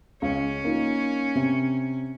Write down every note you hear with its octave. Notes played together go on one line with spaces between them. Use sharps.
C#2 C#4
A#3 D#4 F4
C3